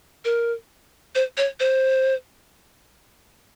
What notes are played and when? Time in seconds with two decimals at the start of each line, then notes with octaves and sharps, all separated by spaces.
0.25 A#4
1.15 C5
1.37 C#5
1.60 C5